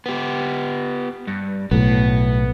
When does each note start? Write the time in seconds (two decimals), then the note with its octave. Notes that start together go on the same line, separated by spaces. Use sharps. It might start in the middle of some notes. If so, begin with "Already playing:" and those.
0.06 B3 G4
1.27 G2
1.71 B1 A2 B3